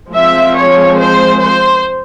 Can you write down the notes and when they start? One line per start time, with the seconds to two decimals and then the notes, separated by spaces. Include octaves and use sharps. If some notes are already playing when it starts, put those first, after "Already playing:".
0.11 F3 G#3 C4 E5
0.54 C#5
0.97 C5
1.39 C5